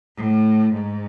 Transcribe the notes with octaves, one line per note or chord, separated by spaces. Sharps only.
A2
G#2